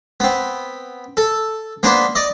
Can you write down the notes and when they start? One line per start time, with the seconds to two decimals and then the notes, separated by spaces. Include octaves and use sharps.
0.20 B3 C4
1.17 A4
1.83 A#3 B3 D4 B4 C5
2.15 D5 D#5